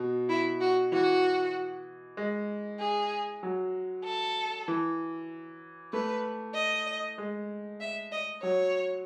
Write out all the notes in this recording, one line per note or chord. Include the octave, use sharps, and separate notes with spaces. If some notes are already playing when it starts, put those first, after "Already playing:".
Already playing: B2
E4
F#4
E3 F#4
G#3
G#4
F#3
A4
E3
A3 B4
D#5
G#3
E5
D#5
F#3 C#5